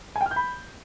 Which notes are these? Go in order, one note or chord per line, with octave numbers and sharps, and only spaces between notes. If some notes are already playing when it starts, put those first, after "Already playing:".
G#5
G5
F6
G6
B5